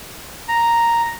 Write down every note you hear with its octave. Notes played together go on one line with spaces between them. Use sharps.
A#5